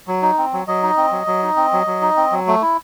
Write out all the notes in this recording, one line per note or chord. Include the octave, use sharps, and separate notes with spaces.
F#3
D#4
C4
F#3
F#3 D#5
D#4
C4
F#3
F#3
D#4
C4
F#3
F#3
D#4
C4
F#3
A3
E4